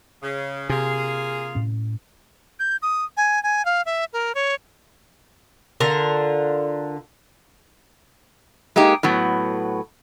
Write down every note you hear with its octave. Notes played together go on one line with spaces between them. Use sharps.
C#3
C3 A#3 F4 G#4
A2 C#4
G6
D#6
G#5
G#5
F5
E5
A#4
C#5
D3 F4 A#4
G#3 A#3 D#4 G4
A2 F#3 B3